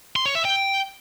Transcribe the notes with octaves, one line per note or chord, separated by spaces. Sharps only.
C6
C#5
E5
G5